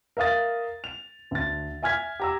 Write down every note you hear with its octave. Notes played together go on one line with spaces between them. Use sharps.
A#4 E5 F5 D#6 A6
F7
D2 A6
E5 G#5 F6 G#6 B6
G4 A#5 E6